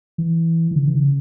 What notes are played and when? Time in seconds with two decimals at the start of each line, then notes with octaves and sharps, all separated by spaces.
0.18 E3
0.71 E3
0.76 C#3
0.87 E3
0.95 C#3